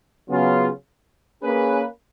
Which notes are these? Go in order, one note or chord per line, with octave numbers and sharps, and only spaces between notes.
C#3 F#3 B3 F4
A#3 C#4 G#4 B4